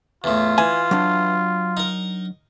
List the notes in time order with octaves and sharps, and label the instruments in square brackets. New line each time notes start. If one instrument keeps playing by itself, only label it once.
[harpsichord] E2 A2 [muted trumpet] F4
[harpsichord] E3 [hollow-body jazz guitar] G#5
[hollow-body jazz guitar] F#3 D4
[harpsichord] D#4 A#4